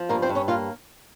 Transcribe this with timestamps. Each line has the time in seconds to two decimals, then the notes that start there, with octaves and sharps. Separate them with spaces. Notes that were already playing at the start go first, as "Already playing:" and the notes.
Already playing: F3
0.09 G2 A#3 A#4
0.22 C4 C5
0.29 G2
0.35 C#4 C#5
0.48 A#3 F4 F5